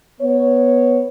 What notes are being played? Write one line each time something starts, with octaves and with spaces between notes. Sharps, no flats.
B3 C#5